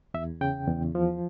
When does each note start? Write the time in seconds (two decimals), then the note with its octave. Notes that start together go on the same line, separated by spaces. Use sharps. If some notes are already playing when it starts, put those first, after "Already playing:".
0.14 E2 E5
0.41 C#3 G5
0.68 E2
0.95 F3